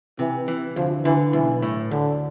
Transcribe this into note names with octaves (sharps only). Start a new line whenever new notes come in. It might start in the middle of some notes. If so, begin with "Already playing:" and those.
C3 E3
E3
D2 F3
D3 E3
B1 E3
A2
D2 D3